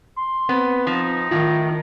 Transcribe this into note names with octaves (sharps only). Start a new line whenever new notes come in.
C6
B3 C4
F3 D#4
A2 D#3 F4